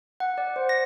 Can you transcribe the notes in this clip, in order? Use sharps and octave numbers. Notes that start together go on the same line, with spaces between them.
F#5
D5
C5
A#6